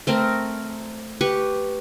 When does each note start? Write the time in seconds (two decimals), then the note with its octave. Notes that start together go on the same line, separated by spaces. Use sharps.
0.07 A3 C4 A#4
1.21 G4 B4 C#6